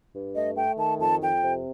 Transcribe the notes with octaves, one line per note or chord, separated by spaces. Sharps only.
G2
A3 D#5
A3 G5
D#3 A5
F2 A5
F2 G5
C3